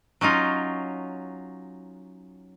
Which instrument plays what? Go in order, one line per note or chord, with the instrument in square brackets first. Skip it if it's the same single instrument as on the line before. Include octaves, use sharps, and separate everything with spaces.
[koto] F#3 C#4 D#4 F4